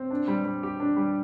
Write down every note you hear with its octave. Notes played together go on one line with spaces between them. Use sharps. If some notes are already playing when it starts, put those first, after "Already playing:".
Already playing: C4
D4
G3
G3
G4
D4
G3